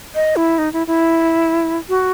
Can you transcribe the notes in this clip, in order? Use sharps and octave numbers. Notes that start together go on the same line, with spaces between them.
D#5
E4
D#4
E4
E4
F#4